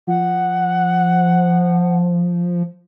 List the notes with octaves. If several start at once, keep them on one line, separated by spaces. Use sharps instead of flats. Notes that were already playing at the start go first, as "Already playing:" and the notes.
F3 F#5